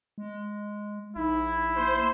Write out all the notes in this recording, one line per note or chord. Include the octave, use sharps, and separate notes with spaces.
G#3
A#1 D#4 E4
A#3 C5